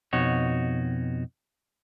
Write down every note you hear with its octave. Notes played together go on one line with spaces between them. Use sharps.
F2 B2 D#4 F#4 C#5